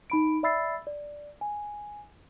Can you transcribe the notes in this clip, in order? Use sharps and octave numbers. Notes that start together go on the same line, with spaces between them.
D#4 B5 D7
D5 E5 B5 E6 A6 C7
D5
G#5